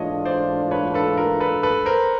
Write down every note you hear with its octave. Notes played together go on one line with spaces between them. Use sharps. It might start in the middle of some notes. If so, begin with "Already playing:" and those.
Already playing: G#2 E3 A3 D4 F4 C#5 D#5
C5 D5
B4 C#5
A4 B4
A#4
A4 B4
A4 B4
A#4 C5